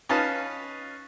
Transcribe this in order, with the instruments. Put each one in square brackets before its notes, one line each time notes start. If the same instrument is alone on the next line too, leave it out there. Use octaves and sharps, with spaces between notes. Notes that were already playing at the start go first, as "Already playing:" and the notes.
[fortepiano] C#4 D#4 B4 F5 A5